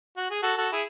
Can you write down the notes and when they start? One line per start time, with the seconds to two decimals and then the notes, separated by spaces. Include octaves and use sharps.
0.17 F#4
0.31 G#4
0.43 F#4 A4
0.57 F#4 A4
0.72 E4 G#4